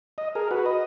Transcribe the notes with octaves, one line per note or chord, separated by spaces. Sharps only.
D#5
G#4 A#4
F#4 B4
D#5